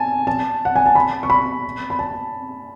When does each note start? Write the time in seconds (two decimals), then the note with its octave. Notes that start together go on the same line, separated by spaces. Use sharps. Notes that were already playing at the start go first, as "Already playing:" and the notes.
Already playing: G#5 A5
0.27 A5
0.65 F#5
0.76 G#5
0.86 A5
0.95 B5
1.23 C#6
1.30 B5
1.90 B5
1.99 A5